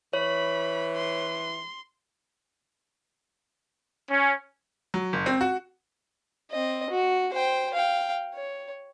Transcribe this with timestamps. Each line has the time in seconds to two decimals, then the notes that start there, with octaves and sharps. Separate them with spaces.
0.13 E3 C#5 B5
0.95 C6
4.09 C#4
4.94 F#3
5.13 F#1
5.26 C4
5.41 F#4
6.51 C4 D#5
6.90 F#4
7.33 C5 G5
7.74 F5 G5
8.35 C#5